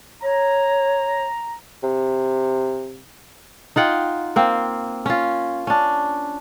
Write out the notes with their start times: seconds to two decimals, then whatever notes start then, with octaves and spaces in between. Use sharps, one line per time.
0.22 C#5 A#5
1.83 C3
3.76 D#4 F4 F#5 G5
4.36 A#3 C4
5.06 C#4 F4
5.67 C#4 D4